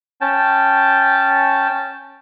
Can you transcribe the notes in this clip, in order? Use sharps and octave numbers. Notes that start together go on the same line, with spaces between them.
C#4 G5 A5